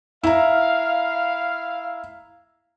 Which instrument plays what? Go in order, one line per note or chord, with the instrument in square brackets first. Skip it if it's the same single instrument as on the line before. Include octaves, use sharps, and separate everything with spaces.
[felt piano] E4 A#5 [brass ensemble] F5